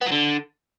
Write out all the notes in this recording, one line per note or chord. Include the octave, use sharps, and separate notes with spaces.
B3
F#3
D3